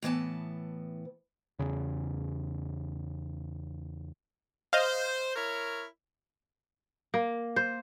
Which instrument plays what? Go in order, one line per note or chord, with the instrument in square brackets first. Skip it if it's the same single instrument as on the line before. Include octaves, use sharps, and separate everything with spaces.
[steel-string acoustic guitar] A2 E3 B3 A5
[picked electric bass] E2 C#3
[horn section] C5 [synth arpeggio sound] D#5 F5
[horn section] E4 A#4 C#5
[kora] A#3
C5